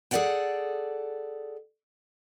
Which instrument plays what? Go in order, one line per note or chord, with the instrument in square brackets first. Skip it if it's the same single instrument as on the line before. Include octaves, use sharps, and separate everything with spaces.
[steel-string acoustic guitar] G#4 A4 C#5 D5 F#5 G5